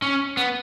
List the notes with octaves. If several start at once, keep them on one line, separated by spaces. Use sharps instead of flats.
C#4
B3